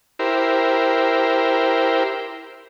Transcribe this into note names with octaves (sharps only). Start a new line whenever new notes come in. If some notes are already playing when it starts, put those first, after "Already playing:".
E4 G4 A#4 C5